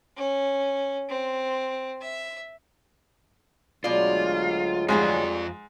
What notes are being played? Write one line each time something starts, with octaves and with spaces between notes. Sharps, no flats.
C#4
C4
E5
D2 B2 F#3 G#3 F4 D5
F2 G#2 G3 F4 G#4 C#5